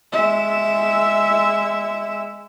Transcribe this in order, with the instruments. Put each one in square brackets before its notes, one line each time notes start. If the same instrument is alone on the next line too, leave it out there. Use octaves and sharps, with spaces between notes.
[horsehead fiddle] G#3 E5